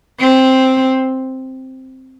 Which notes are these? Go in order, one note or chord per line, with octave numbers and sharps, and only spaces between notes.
C4